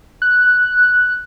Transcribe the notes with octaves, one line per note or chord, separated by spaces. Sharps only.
F#6